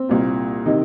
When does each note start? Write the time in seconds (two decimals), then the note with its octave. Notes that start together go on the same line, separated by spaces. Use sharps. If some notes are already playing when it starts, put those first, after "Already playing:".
Already playing: C4
0.09 C2 A#2
0.66 C3 D#3 D#4